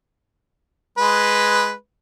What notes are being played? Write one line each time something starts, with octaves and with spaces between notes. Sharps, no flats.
G#3 B4